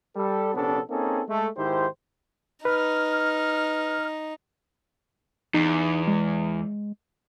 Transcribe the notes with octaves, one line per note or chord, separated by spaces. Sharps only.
G3 A4
A#1 C3 B3 C#4 D4 A4
A#3 C4 C#4 D#4 G#4 A4
G#3 A3
G#2 D#3 E4 G4 C5
D#4 B4 F6
E2 D#4
G#3